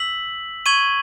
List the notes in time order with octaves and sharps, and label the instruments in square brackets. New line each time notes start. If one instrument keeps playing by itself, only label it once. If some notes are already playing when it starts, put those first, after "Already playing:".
Already playing: [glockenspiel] E6 B6 F#7
C#6 G#6 D#7 F#7